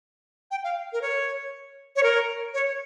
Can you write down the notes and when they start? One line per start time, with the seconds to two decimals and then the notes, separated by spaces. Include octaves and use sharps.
0.51 G5
0.64 F5
0.93 A#4
1.02 C#5
1.96 C#5
2.03 A#4
2.54 C#5